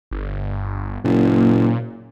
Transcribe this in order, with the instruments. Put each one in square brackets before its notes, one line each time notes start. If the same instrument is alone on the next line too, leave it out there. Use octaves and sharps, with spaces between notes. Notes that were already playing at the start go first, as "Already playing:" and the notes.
[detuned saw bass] G1
[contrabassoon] F#1 [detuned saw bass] A#2